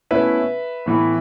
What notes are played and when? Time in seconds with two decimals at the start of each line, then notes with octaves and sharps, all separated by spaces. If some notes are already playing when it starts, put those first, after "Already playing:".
0.11 B2 A3 C#4 E4 B4 E5
0.86 A2 E3 B3 E4